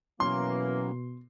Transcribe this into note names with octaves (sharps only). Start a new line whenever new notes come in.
B2 E3 F#3 A#3 B3 C#4 C6